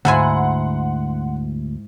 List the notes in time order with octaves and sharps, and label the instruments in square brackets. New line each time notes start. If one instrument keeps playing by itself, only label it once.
[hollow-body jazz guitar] D2 [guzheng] G#2 E4 G#5 [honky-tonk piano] F#5 C6